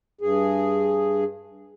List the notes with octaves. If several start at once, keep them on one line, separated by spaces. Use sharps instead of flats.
G2 G#4